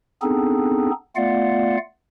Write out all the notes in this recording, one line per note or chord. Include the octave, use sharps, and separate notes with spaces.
B3 C4 D4 D#4 G#4 A4
A3 B3 F4 D5 F5 F#5